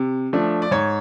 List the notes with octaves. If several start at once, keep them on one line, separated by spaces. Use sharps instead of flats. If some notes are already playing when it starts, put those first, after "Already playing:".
Already playing: C3
F3 A3 D4
D5
G#2 C#5